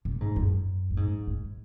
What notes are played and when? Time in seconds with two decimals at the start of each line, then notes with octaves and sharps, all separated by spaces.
0.05 C3
0.21 G#2
0.36 F#2
0.90 A2
0.97 G#2
1.27 G#2